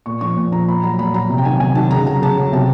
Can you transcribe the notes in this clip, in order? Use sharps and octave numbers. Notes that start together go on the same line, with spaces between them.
A#2 C#6
F3 C#6
A#2
F3 A#5
A#2 B5
F#3 A#5
A#2 B5
F#3 A#5
C3
G5
D#3 F#3 G#5
C3 G#5
D#3 F#3 A5
C#3 A#5
F#3 A#5
C#3 A5
F#3
C3 A5